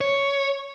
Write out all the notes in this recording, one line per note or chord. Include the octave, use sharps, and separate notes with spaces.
C#5